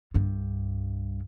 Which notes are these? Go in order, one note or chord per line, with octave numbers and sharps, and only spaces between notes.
C2 G2